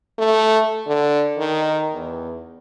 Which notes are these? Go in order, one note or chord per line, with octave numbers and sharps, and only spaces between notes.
A3
D3
D#3
E2